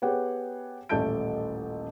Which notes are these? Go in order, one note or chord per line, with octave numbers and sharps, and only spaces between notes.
B3 G4 G#4 C#5 F#5 G5
D#1 A1 A3 A5 G6 D7